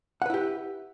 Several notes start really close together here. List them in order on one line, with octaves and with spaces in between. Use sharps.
F#5 B4 E4 G4